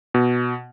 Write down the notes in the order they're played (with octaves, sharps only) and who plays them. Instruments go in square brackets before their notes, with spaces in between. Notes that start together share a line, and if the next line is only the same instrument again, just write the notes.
[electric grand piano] B2